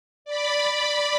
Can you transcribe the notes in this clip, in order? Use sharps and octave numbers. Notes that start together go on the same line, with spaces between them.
D5 B5